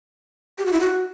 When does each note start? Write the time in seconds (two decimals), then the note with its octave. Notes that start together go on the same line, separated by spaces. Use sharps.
0.58 G4
0.66 F#4
0.73 E4
0.80 F#4